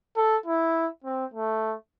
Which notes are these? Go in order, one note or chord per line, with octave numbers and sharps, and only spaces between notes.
A4
E4
C4
A3